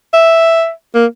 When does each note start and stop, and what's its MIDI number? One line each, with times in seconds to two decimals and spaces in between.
0.14 0.70 76
0.95 1.06 58